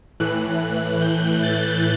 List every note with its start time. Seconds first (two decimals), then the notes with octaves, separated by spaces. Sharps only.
0.20 A2 E3 F#6
1.02 G6
1.43 A6